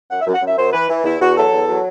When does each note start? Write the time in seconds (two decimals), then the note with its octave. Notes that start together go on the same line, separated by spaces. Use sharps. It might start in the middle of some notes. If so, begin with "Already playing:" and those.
0.10 F#2 F#5
0.21 E5
0.26 F#2
0.33 F#5
0.41 F#2
0.46 E5
0.57 F#2 C5
0.73 E3 B4
0.89 E3
1.04 E2 E4
1.20 E2 F#4
1.36 F#3 A4
1.52 E2
1.68 F#3